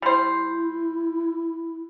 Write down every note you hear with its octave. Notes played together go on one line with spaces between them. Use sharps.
G3 E4 C5